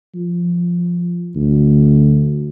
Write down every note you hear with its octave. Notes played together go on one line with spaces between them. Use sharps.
F3
D2